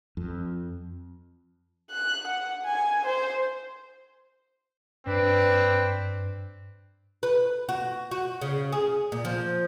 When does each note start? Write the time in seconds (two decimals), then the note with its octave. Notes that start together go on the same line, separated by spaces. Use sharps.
0.17 F2
1.91 F#6
2.28 F#5
2.65 G#5
3.06 C5
5.07 G2 C4 D4 B4
7.23 B4
7.69 F#4
8.11 F#4
8.41 C#3
8.72 G#4
9.12 A#2
9.25 F3